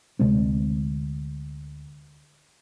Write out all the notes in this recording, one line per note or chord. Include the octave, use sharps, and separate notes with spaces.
D2 C3 G#3 C4